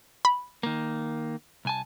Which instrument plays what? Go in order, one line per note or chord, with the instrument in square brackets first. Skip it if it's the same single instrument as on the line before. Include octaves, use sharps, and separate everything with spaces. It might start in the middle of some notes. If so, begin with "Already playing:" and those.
[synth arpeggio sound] B5
[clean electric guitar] D#3 A#3
C2 G#5 A5